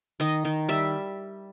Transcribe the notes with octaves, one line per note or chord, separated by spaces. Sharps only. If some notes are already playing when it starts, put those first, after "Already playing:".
D#3 D#5
D#3
G3 E5